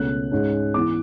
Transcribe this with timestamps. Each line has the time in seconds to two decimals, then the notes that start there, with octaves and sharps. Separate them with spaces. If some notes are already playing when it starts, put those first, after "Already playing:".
Already playing: C#2 B2 A3 C#4 F#6
0.31 G#2 G#3 C#4
0.74 E3 B3 D6